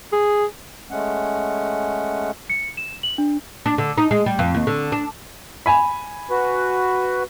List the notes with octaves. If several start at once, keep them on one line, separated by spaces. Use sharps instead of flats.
G#4
G#3 A3 C#4 F#5
C#7
E7
F#7
D4
D4
D3
D#4
G#3
G3
F2
D#2
D3
D4
G#5 B5
F#4 B4